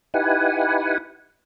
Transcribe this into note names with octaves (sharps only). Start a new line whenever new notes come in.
D#4 E4 G4 B4 F#5 G#5